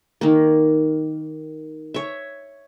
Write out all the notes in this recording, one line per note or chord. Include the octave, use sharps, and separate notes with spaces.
D#3 A#3
C#5 E5